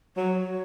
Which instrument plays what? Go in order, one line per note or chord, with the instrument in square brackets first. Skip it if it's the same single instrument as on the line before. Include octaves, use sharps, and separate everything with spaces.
[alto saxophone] F#3 [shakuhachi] C#5